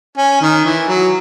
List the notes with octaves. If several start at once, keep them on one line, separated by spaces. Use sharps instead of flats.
C#4
D#3
E3
F#3